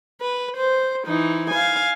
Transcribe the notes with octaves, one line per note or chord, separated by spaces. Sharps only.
B4
C5
E3 D#4
F5 G#5